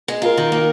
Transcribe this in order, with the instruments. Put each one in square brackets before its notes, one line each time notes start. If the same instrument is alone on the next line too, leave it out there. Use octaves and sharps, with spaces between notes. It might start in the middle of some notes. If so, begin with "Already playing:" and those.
[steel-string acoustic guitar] G#3
[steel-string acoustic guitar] F4 [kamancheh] A#4
[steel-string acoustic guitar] D#3
A#3